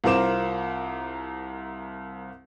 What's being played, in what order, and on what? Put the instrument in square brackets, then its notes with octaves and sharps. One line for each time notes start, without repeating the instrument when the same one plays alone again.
[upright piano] C2 F4 A#4 C5 D6 E7